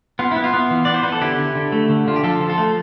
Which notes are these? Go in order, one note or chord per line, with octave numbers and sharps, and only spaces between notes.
B3 F4
B3 E4
F4
B3
E3
B3 D5
C5
B3 B4
A4
D3 E4 G4
D3
D3
A3
D3
D3 F4
G4
F3 F4 A4
F3
F4 A4
A3